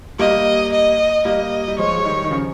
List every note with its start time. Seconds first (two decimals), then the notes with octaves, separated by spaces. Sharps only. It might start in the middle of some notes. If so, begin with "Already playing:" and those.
0.19 G3 A#3 D#5
0.72 D#5
1.25 G3 A#3 D#5
1.68 G3
1.78 F3 G#3 C#5
1.98 G#3
2.05 D#3 G3
2.24 D#3
2.31 C#3 F3